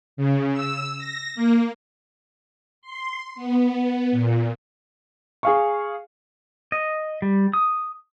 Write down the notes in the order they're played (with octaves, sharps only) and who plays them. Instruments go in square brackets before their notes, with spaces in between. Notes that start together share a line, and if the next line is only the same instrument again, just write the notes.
[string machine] C#3
E6
A#6
A#3
C6
B3
A#2
[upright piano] G#4 F5 C#6
[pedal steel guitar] D#5
G3
D#6